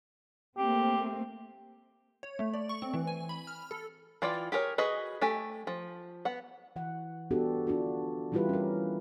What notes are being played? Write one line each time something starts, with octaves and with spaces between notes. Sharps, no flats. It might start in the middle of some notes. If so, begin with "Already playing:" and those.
A3 A#3 C4 G4
C#5
A3
D5
C#6
C4
E3
G#5
B5
F6
A4
E3 F4 D5 G5
G4 G#4 A#4 C#5
F#4 G#4 B4 D#5
A3 G4 G#5
F3
B3 F#5
E3 F#5
B3 D4 F#4 G4 A4
D4 F4 F#4
E3 G3 E4 F4 G4 B4
C#4 A#4